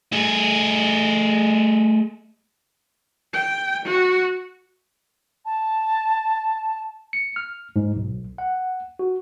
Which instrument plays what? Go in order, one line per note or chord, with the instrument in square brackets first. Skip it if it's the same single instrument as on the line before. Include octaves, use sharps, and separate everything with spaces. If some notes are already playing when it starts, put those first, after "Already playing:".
[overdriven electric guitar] A3 G#4
[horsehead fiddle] G5
F#4
[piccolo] A5
[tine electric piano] C#7
F6
G#2
B1
F#5
F#4